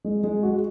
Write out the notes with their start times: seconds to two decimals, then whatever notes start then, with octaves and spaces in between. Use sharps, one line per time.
0.04 G#3
0.24 G#3
0.43 F#4